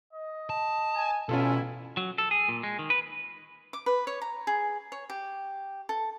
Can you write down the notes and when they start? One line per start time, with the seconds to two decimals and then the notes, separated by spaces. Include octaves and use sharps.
0.13 D#5
0.50 A5
0.96 G#5
1.29 A1 B2 C#4 E4 F4 A4 G#5
1.97 F#3
2.18 A4
2.31 G#4
2.49 A#2
2.63 G#3
2.79 D#3
2.90 B4
3.73 D6
3.86 B4
4.07 C#5
4.22 A#5
4.47 G#4
4.92 C#5
5.10 G4
5.89 A4